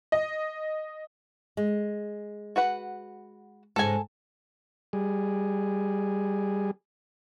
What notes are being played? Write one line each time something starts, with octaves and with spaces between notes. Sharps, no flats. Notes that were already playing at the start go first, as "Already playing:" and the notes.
D#5
G#3
F#4 B4 F#5
G#2 C#3 G#3 A4 G#5
G3 G#4